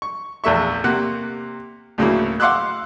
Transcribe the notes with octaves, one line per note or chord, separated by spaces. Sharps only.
C#6
A#1 E2 A3 E5 C#6
C3 A#3 F#5 F#6
D2 A2 C#3 F#3 A#3 E4
F5 F#5 C6 D6 E6 F#6